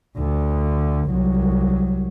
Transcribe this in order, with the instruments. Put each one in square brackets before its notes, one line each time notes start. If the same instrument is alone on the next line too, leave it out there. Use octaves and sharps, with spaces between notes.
[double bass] D2 D3
C2 F#3